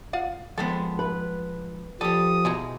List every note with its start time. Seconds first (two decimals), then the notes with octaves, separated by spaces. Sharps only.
0.13 F4 F5 F#5
0.58 F3 G#3 B3 C4 A4
0.99 B4
2.01 F3 G3 G4 A4 D#6
2.45 B2 E3 G#3 D#4